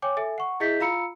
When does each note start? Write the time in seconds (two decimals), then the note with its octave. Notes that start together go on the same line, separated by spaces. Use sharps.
0.02 C#5 G5 G#5 D6
0.17 A4 E5 G#5
0.38 F#5 C#6
0.60 E4 G#4 D#5 E5 G6 B6
0.80 F4 F5 A#5 B5 E6 C#7